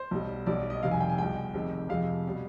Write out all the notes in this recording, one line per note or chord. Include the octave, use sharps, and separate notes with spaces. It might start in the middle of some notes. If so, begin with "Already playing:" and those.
Already playing: C5
B1 B2 G3
B1 B2 G3 D5
D#5
F1 F2 C3 D#3 G3 F5
G#5
G5
G#5
C2 B2 G#3 G5
F1 F2 C3 D#3 G#3
F2 C3 F3 G#3 F5
B2 G3